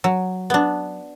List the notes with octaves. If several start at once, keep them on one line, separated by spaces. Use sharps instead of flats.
F#3
B3 D4